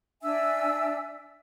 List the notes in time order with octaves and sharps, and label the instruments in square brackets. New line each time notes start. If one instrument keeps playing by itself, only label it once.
[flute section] D4 E5 G#5 E6